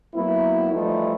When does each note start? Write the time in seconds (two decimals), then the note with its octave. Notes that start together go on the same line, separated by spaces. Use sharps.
0.14 F#3 A#3 B3 E4
0.72 E3 F3 G3 A3 D#4 E4